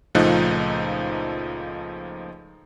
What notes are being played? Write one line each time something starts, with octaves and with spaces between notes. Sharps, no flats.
C#2 A#2 F3 A3 D#4 F#6